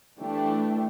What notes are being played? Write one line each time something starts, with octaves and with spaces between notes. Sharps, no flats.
E3 A3 D4 G4